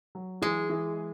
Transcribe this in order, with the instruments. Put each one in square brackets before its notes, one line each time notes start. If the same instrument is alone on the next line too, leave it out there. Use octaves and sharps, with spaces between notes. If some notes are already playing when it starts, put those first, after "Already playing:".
[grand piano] F#3
[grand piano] E3 [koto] G#3
[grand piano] E3